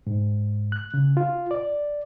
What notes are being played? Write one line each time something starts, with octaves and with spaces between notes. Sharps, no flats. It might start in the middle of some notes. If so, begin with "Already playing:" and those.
G#2
F#6
C#3
F4
D5